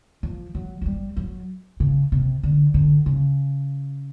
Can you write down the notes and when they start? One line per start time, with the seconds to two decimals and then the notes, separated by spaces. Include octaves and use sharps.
0.23 F3
0.55 F#3
0.82 F#3
0.86 G3
1.17 F#3
1.80 C#3
2.12 C3
2.43 D3
2.74 D3
3.06 C#3